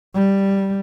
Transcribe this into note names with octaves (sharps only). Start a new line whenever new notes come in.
G3